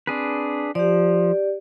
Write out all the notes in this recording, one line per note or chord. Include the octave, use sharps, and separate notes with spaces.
C4 D4 G#4 B4
F3 G4 D5